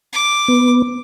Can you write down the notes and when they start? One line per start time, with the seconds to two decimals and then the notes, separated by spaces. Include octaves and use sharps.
0.13 D6
0.48 B3